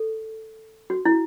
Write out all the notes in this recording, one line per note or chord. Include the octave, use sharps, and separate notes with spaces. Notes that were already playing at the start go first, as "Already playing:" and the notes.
Already playing: A4
F#4
E4